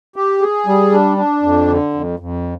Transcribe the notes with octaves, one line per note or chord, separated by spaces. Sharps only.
G4
G#4
G3
D4
D4
F2
D3
F2
F2